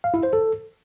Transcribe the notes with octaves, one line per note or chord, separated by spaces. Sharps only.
F5
E4
C5
A4